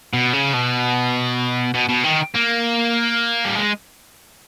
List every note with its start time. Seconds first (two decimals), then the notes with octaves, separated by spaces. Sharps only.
0.13 B2
0.33 C#3
0.53 B2
1.74 B2
1.89 B2
2.04 D#3
2.35 A#3
3.45 G3
3.55 G#3